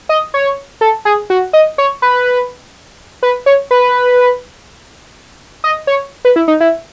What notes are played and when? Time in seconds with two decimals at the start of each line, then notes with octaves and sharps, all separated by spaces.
0.09 D#5
0.34 C#5
0.81 A4
1.05 G#4
1.30 F#4
1.53 D#5
1.78 C#5
2.02 B4
3.23 B4
3.46 C#5
3.71 B4
5.64 D#5
5.87 C#5
6.25 B4
6.36 E4
6.48 D#4
6.60 E4